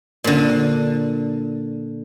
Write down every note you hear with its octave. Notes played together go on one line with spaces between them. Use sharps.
A#2 D3